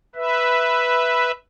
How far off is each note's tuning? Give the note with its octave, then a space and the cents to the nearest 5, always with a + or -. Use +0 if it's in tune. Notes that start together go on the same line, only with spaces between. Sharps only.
B4 +0 E5 +0